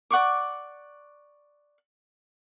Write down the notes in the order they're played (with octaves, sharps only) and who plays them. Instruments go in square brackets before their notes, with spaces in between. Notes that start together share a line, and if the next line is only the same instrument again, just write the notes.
[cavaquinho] D5 F#5 C#6 D6